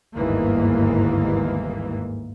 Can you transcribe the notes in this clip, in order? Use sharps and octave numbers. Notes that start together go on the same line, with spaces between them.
G1 D#2 G#2 E3 A#3